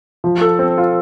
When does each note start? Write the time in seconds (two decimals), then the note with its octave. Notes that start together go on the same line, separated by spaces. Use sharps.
0.24 F3
0.41 A4
0.59 C4
0.78 F4